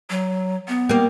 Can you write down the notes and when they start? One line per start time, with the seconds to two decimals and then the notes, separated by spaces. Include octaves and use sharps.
0.10 F#3
0.68 B3
0.89 G3 A#3